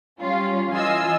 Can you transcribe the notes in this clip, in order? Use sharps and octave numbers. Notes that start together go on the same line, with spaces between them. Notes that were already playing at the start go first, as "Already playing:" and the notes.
G3 C#4 F4
E3 F4 D#5 G#5 E6